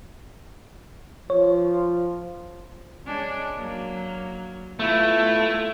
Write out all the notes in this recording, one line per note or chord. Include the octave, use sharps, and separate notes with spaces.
F3 C#5
G#3 C#4 D4
F#3 A#3
A3 B3 E4 F4